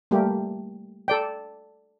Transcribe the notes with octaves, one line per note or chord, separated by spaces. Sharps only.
G3 A3 A#3 G4
A4 D5 G5